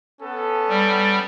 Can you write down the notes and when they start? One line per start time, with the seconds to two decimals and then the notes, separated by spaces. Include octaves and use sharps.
0.21 B3 C#4 A4
0.69 G3